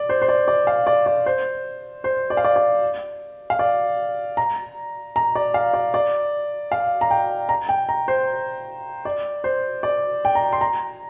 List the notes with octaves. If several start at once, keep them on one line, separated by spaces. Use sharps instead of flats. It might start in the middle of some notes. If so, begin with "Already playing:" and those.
Already playing: D5
C5
C5
D5
D5
F5
D5
D5
C5
C5
D5
F5
D5
D5
F5
D5
A#5
A#5
D5
F5
D5
D5
F5
A#5
G5
A#5
G5
A#5
C5
D5
C5
D5
G5
A#5
C6
A#5